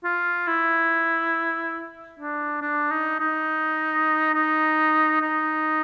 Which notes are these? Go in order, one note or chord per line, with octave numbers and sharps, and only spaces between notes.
F4
E4
D4
D4
D#4
D#4
D#4
D#4